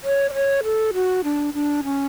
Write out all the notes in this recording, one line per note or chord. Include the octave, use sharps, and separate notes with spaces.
C#5
D5
C#5
A4
F#4
D4
D4
C#4